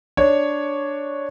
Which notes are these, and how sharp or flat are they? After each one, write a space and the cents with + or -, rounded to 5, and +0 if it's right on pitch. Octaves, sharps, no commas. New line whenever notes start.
D4 +0 C#5 +0